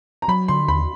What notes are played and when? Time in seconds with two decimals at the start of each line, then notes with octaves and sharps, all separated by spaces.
0.22 A#5
0.28 F#3 B5
0.48 D3 C6
0.68 D#2 B5